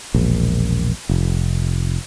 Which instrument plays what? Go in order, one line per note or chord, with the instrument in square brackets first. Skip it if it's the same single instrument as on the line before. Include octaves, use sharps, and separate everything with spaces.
[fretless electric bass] E1 A#1
F1